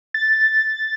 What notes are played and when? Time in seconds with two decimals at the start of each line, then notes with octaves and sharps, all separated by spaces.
0.14 A6